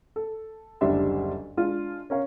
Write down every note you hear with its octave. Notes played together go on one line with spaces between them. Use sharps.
A4
F#1 D2 G3 D4 E5 C6
G#3 D4 F4
C#4 A#4 C#5 F5